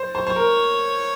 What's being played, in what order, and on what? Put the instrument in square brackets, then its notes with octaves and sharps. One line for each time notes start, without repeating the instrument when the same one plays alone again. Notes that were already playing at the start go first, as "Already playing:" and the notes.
Already playing: [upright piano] C5
C5
[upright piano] C5 [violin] C#5
[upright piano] A#4